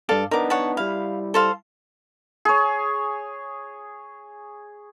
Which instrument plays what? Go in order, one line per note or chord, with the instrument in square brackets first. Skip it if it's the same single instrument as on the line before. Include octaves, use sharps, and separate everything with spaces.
[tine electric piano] G2 D6 [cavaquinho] A4 D5 F5
[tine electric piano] B3 D4 D#4 [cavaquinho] A#4 D6
[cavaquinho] C#5 F#5 A5
[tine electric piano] G3 E4 [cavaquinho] F5
[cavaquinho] A4 C5 F5
[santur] G#4 C#5